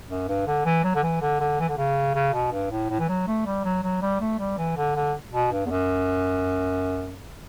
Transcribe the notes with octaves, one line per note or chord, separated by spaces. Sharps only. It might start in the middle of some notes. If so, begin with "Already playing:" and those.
F#2
G2
D3
E3
F#3
D3
E3
D3
D3
E3
D3
C#3
C#3
B2
G2
A2
A2
E3
F#3
A3
G3
F#3
F#3
G3
A3
G3
E3
D3
D3
B2
G2
E2
F#2